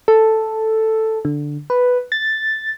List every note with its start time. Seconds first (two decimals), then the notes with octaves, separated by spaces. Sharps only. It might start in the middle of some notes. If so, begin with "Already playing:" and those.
0.08 A4
1.25 D3
1.70 B4
2.12 A6